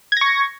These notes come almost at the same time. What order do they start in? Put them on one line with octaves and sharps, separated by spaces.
G#6 A#6 C#6